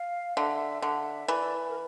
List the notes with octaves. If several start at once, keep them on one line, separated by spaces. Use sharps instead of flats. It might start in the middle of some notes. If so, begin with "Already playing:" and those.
Already playing: F5
D3 E5
D3 E5
E3 D5
A#4